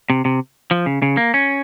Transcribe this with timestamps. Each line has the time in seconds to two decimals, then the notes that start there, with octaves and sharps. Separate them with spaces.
0.10 C3
0.25 C3
0.71 F3
0.86 C#3
1.02 C#3
1.17 A#3
1.34 C#4